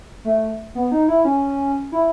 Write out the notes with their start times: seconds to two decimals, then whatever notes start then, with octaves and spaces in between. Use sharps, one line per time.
0.24 A3
0.75 B3
0.92 D#4
1.08 E4
1.25 C#4
1.92 E4